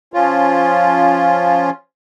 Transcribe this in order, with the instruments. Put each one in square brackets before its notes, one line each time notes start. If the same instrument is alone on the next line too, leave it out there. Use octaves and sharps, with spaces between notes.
[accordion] F3 C#4 F4